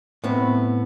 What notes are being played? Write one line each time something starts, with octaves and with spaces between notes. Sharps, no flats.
A2 B3 C4